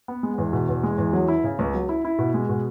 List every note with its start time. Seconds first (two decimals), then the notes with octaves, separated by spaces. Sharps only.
0.08 B3
0.23 G#3
0.38 E2
0.53 B2
0.68 E2
0.83 G#3
0.98 E2
1.13 F#3
1.28 E4
1.44 C#3
1.59 C#2
1.74 F#3
1.89 E4
2.05 E4
2.18 B2
2.34 G#3
2.49 B2